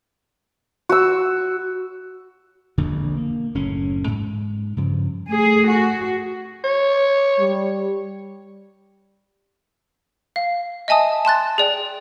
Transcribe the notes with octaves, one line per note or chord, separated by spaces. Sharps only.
F#4 E6
E1 A#1 F2 D3
A#3
F#1 A2 C#4
G#2
G2 C#3 F3
A3 G#4
F#4
C#5
G3
F5
D#5 E5 G#5 A5 D#6
A5 C6 F#6 A6
G#4 D5 G5